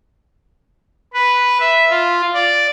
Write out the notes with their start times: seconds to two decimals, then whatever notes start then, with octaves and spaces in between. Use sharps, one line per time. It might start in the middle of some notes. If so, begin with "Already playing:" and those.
1.14 B4
1.60 E5
1.90 F4
2.34 D5